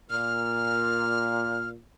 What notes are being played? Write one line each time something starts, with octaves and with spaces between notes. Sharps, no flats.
A#2 F6